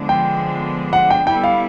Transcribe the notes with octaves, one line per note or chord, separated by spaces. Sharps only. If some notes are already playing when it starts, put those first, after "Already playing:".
Already playing: D3 F3 G#3 B3 D4
G5
F#5
G5
G3 B3 E4 A4 G5
F5